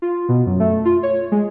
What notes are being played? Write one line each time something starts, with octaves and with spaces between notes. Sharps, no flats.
F4
B2
F#2
A3
F4
C#5
G#3